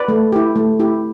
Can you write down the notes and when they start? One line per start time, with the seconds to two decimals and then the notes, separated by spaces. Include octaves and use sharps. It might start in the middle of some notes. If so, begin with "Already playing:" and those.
Already playing: B4 D5
0.08 A3
0.32 E4 G4
0.56 A3
0.79 E4 G4